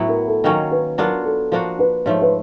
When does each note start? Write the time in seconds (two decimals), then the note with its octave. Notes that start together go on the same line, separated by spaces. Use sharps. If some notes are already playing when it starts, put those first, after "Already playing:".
Already playing: A2 F#3 B3 E4
0.08 A#4
0.27 A4
0.44 D#3 F#3 A#3 C#4 A#4
0.71 B4
0.98 F#3 B3 D4 F4 A#4
1.25 A4
1.52 F3 A#3 D4 F#4 C5
1.79 B4
2.06 G#2 F3 A3 C#5
2.22 B4